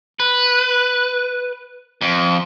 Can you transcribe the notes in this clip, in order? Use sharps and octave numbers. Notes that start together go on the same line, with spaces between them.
B4
F2